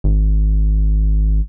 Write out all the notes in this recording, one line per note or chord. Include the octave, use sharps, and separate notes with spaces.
G#1